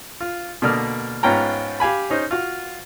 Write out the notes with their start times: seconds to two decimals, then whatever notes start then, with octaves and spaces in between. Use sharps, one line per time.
0.21 F4
0.62 B2 D3 A#3 D5 D#6 F6
1.23 G#2 B3 C#4 F4 G5 A#5
1.80 G4 F5 G#5 B5
2.10 C#4 D#4 C5
2.31 F4 F#4 F5